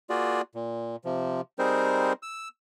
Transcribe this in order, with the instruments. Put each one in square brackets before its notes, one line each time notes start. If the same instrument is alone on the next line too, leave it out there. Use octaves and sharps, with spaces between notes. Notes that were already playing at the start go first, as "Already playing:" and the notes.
[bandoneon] A#3 F4 F#4 G#4 D5
A#2
C3 F3
G3 C4 D#4 G#4 A#4 C5
E6